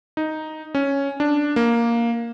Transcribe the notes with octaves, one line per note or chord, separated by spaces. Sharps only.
D#4
C#4
D4
A#3